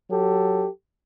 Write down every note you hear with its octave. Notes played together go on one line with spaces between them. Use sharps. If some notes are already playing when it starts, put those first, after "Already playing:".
F#3 G4 A4